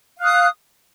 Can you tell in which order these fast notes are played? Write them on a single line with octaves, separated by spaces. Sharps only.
F5 F#6 D#6